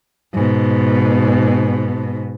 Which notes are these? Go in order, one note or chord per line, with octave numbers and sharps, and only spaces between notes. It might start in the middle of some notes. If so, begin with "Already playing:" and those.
G#2 B2